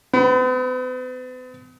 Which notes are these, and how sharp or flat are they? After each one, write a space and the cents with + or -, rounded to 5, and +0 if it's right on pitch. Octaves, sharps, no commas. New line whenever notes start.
B3 +45 B5 +0